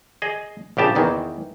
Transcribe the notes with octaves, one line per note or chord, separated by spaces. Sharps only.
G#4 D#5
A#1 C#3 G4 A5
E2 D#3 E3